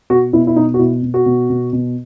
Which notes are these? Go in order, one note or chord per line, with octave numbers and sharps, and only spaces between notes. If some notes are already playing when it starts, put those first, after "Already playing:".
B2 F#4
B2 E4
E4
B2 D#4
F#4
B2 E4
B2
F#4
B2
B2
B2